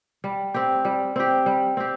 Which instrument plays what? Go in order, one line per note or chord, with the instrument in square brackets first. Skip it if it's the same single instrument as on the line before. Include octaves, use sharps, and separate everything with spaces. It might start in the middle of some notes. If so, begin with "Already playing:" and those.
[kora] G3
C4 G4
G3
C4 G4
G3
C4 G4